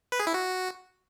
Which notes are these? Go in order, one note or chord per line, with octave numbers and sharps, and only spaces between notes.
B4
G#4
E4
F#4